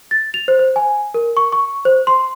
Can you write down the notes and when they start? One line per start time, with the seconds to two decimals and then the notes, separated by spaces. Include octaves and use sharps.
0.11 A6
0.34 F7
0.48 C5
0.59 C5
0.76 G#5
1.14 A#4
1.37 C#6
1.52 C#6
1.85 C5
2.07 C6